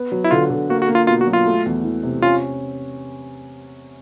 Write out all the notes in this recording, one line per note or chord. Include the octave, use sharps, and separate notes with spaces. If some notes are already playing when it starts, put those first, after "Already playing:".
Already playing: B3
F#3
E4
D3 F4
D3
A#3 F#4
F#4
A#3
F4
B2 F4
F#4
F#3
F4
A3
E2
E3
C3
C#4 F4